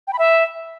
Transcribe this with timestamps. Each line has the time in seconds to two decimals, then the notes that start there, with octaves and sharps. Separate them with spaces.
0.07 G5
0.13 B5
0.19 E5